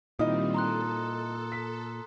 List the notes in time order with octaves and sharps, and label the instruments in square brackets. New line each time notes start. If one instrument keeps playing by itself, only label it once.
[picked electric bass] A#2 [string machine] D#3 G3 C4 [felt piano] D#4 E4 D#5 [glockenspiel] D#6
[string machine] A4 [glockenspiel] A#5 C6 F#6
[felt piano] B6